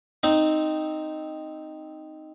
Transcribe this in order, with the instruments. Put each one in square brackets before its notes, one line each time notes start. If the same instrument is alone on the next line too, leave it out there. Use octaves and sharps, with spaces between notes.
[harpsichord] C4 D#4